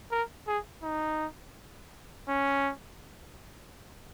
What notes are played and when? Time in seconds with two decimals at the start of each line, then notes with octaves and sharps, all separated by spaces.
0.11 A#4
0.47 G#4
0.83 D#4
2.29 C#4